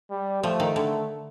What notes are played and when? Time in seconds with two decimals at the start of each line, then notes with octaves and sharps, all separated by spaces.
0.10 G3
0.43 F3 A3
0.60 D#3
0.76 D3